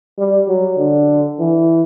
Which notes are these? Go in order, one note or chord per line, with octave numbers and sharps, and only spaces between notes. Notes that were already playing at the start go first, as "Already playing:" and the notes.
G3
F#3
D3
E3